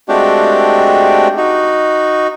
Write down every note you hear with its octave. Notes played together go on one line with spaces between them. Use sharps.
G#3 A3 C4 D4 F#4 G4
D#4 F#4